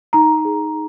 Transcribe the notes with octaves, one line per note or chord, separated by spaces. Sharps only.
D#4 A#5
G#4